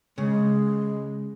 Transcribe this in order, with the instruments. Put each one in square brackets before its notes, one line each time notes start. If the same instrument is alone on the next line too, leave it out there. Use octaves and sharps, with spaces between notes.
[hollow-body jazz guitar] C#3 [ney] G#3